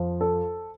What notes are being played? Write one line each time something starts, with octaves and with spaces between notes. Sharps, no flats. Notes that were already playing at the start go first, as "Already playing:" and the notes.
Already playing: F2 F3
A4